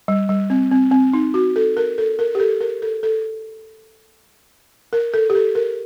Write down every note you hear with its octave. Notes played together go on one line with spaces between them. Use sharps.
G3
G3
C4
C4
C4
D#4
F#4
A4
A#4
A4
A#4
G4
A4
A#4
A4
A4
A#4
A4
G4
A4
A#4